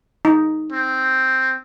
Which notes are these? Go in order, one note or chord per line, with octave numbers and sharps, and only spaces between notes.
D#4
C4